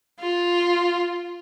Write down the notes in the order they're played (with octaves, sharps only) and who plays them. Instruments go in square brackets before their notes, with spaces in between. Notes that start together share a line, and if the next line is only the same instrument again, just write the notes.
[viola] F4